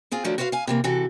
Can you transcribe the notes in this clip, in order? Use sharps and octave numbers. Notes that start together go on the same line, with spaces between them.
C4 F4 G#4
D#3 F3 F#3 A3 D4
F#4 B4 C5 D#5 F5
F5 G#5
C3 E3 A#3
C3 E3 F#4 A4